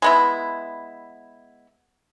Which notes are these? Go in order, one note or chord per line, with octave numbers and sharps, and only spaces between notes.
G#3 B3 E4